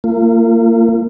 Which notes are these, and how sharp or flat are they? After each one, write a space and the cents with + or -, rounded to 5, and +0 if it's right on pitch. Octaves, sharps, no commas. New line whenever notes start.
A#3 -25 F4 -35